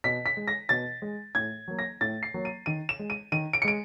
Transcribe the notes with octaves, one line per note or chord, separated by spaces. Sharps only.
B2 B6
B6
G#3
A#6
B2 A6
G#3
A2 G#6
F#3 A#3
A#6
A2 A6
C7
F#3 A#3
D#7
D#3 D#7
E7
G#3
D#7
D#3 D#7
D7
C#7
G#3 D7